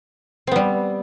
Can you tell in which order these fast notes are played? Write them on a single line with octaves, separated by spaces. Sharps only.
C4 B3 G3